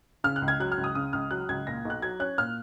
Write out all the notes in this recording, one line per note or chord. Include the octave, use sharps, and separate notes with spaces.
C#3 F6
F#6
C#2
G#6
F#3 F#6
F6
C#2
D#6
C#3 D#6
C#2 F6
F#3 F#6
C#2 G#6
A#2 A#6
B1
F#6
F#3 G#6
C#4 F#6
A#2 F6